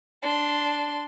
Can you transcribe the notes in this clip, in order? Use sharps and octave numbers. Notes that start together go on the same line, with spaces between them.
D4 C6